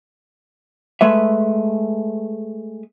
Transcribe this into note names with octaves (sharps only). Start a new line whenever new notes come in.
G#3 A3 B4 E5